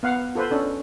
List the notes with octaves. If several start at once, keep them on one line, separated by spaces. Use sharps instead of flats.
B3 F5 F#5
F4 A4 B4 C5
C#4 D4 A4